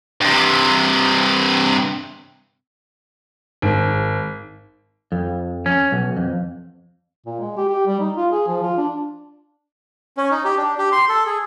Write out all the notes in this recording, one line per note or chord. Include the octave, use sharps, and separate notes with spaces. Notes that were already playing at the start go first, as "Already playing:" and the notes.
G2 C3
G#1
F2
C#4
B1
F2
A#2
G#3
G4
G4
G3
D#4
F4
G#4
F3
F4
D4
C#4
D#4
G4
D4
G4
C6
A4
G#4